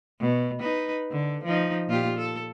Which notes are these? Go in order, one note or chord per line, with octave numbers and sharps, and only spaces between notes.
B2
D#4 B4
D3
F3 D#4
A#2 F4 G4
A4